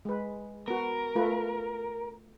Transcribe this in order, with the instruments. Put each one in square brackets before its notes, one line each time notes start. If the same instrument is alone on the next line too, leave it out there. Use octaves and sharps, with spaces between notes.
[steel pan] G#3 B4
[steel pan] B3 F#4 [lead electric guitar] A#4
[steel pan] A3 F4 B4